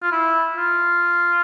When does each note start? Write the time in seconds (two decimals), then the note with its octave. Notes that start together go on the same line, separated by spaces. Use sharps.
0.03 F4
0.12 E4
0.57 F4